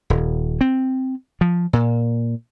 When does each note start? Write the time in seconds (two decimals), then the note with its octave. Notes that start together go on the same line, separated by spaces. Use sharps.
0.10 D#1
0.61 C4
1.41 F3
1.73 A#2